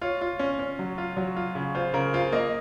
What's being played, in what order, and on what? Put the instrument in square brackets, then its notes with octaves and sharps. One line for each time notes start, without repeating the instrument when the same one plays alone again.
[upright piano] F4 [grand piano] C#5
[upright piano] F4
C#4
C#4
F#3
F4
F#3
F4
C#3
[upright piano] F4 [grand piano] C5
[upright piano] C#3 [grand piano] A#4
[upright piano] F4 [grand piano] C5
[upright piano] A#3 [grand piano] D#5